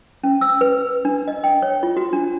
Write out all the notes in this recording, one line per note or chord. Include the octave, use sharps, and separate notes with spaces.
C#4
E6
B4
D4
D#5
G5
C#5
F4
F#4
D4